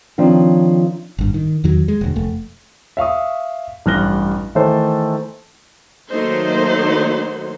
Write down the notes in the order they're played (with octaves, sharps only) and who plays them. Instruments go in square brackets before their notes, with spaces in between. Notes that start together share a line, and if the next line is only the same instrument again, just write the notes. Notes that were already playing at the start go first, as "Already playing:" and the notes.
[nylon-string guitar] D#3 F3 C4 D4 C#5
[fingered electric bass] G#1 G2
D#3
E2 D#3 F#3
G#3
E1 D2
F1 A3
[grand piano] E5 F5 C#6 D#6
A1 G2 F6 F#6 A#6 G7
D#3 E3 A3 D#4 A4 C5
[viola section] D#3 F#3 A3 A#3 D#4 C5